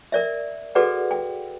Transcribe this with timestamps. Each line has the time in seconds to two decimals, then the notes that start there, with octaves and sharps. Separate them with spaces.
0.12 A#4 D5 E5
0.75 F#4 G#4 A4 B4 D5 F#5
1.11 G5